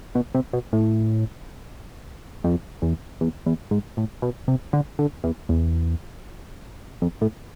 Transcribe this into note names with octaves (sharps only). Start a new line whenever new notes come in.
B2
C3
B2
A2
F2
E2
E2
E2
G#2
A2
B2
C3
D3
D3
E2
E2
F2
A2